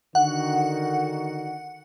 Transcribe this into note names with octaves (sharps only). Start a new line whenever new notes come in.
D3 D#3 F#4 F#5